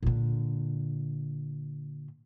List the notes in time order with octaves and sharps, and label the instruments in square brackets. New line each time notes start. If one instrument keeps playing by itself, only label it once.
[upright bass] A#2 D3